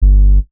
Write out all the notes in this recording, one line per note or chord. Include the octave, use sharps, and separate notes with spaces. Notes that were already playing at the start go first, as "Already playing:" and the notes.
G1